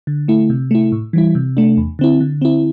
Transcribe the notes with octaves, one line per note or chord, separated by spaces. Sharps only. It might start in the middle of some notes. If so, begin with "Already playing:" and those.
D3
A3 E4
C3
A3 E4
A2
E3 G3 E4
C3
A3 D4
E2
D3 C4 E4
D3
C4 E4